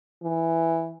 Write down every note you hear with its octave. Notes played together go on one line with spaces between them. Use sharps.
E3